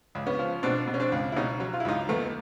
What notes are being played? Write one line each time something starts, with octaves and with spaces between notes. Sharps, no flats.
C#2
B3 C#4
F3
B2 C4 D4
B2
C#4
C4 D4
C#2
E4
B2 C#4 D#4
F#3
F4
E4
C#2 D#4 F4
D#2 A3 B3